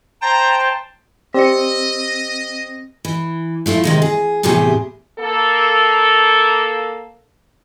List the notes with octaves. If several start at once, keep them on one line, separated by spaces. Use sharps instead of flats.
C5 G5 A5 A#5
C4 G4 D5 D#5 C#7
E3
F3 A3 E4 F4
C3 D#3 G#3
G#4
E2 A2 C3 G4 G#4
A#3 A4